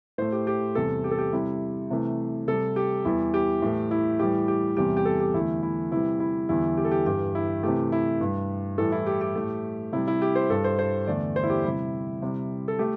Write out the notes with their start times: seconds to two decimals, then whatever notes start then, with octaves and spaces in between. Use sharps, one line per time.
0.18 A2 A3 C5
0.32 G4
0.47 G4
0.75 E2 C3 G3 A4
1.04 G4
1.11 A4
1.18 G4
1.33 C3 G3 E4
1.91 C3 E3 A3
2.48 C3 G3 A4
2.76 G4
3.05 E2 E3 G3 E4
3.34 G4
3.62 A2 E3 A3
3.91 E4
4.19 A2 E3 G3 G4
4.48 G4
4.77 E2 C3 G3 G4
4.97 G4
5.05 A4
5.20 G4
5.34 E2 D3 A3 E4
5.63 E4
5.91 C3 E3 G3 E4
6.20 E4
6.49 E2 D3 G3 E4
6.77 G4
6.85 A4
6.91 G4
7.06 G2 E3 G3 G4
7.35 E4
7.63 C3 E3 A3 G4
7.92 E4
8.21 G2 G3
8.78 A2 E3 G3 A4
8.92 E4
9.07 G4
9.21 G4
9.35 A2 A3
9.93 C3 E4
9.96 G3
10.08 E4
10.22 G4
10.36 C5
10.50 G2 G3 A4
10.64 C5
10.79 C5
11.07 E2 D3 A3 D5
11.36 C5
11.43 E4
11.50 G4
11.65 C3 G3 E4
12.22 C3 G3
12.68 A4
12.79 A3 G4